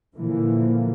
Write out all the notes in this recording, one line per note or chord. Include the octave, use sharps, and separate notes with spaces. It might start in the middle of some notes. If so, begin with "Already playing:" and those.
A#2 D3 E3 F3 A#3